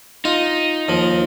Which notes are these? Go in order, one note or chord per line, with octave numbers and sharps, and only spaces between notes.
D#4 F4
D#2 F3